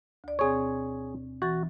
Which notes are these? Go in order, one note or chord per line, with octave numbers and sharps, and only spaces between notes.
D2 D5
B2 C4 G#4 C#5
E3 F#4 A6